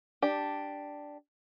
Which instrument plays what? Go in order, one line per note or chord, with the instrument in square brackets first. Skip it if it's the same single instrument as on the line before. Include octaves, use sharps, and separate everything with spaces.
[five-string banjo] D4 G4